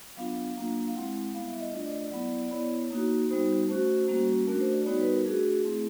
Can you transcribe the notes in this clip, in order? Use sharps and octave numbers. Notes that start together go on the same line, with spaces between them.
F#3 B3 D4 F4 F5
F#3 A#3 D4 F4
F5
G#3 C4 E4 F#5
G3 B3 E4 F5
E5
D#5
A3 D4 F4 D5
D#5
D5
F#3 B3 E4
D5
B3 E4 C#5
A#3 D#4 F#4
G3 B3 D#4 F#4 C5
A3 C#4 F#4 C5
G3 A#3 C#4 F#4
A3 D4 F#4 A#4
C5
D5
G3 B3 D#4 F#4 C#5
B4
A#4
A3 D4 F#4 G#4
A3 C4 E4